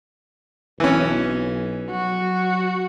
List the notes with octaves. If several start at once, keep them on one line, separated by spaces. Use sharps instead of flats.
B1 E3 C#4
F#3 F#4